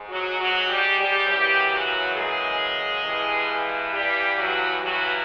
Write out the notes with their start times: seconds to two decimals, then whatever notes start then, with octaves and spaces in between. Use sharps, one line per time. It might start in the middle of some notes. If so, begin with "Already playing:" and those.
Already playing: G#2
0.09 F#3 F#4
0.39 F#3 F#4
0.68 G3 G4
0.98 G3 G4
1.27 F#2 C#3 E3 G3 G4
1.72 F#3 F#4
2.16 G#3 G#4
3.04 G2 E3
3.93 G3 G4
4.36 F#3 F#4
4.81 G2 E3 F#3 F#4